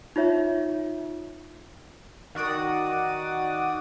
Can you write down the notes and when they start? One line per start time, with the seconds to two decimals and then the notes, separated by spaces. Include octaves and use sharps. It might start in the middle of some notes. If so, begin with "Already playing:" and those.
0.16 D#4 F4 C#5 E5
2.35 D#3 F#4 D5 D#6